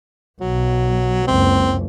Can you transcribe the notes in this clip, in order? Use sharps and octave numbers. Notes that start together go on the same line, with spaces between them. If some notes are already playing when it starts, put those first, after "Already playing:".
B1 F#3
F#1 C#2 C4